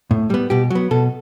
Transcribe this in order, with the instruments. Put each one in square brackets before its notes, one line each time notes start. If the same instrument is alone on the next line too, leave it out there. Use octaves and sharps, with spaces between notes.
[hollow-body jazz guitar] A2
G3 B3
B2 G4
F#3 B3
B2 A4